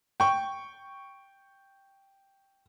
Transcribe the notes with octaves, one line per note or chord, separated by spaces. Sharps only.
G5 C#6